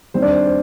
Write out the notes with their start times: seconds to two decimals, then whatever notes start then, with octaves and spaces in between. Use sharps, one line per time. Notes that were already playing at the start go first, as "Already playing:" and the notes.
0.14 D#3 G3 C4 C5
0.22 D4 D5
0.31 C5
0.47 C5